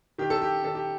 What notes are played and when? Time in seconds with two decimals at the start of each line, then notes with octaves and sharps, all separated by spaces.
0.18 D#3 G4
0.30 A4
0.42 G4
0.64 D#3 A4
0.75 G4